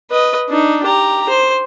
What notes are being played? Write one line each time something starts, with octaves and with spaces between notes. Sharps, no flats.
B4 D#5
D4 D#4
G4 A#5
C5